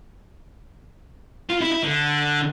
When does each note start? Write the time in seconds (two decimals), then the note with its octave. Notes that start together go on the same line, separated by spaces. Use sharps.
1.49 F4
1.61 E4
1.72 E4
1.84 D3